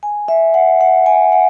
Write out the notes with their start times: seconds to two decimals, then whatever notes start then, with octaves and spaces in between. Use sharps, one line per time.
0.03 G#5
0.28 E5
0.54 F#5
0.81 F#5
1.06 G#5
1.32 F#5